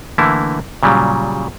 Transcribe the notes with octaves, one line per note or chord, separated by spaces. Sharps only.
D3 E3 A3 A#3 E4
A#2 C#3 F#3 G3